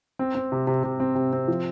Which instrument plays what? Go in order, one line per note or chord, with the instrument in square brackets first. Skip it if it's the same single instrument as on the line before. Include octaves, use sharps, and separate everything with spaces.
[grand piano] C4
C4
C3
C3
C3
C4
C3
C4
F3